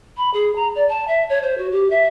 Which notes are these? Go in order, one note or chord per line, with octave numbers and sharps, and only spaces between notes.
B5
G#4
A#5
D5
A5
E5
C#5
C5
F#4
G4
E5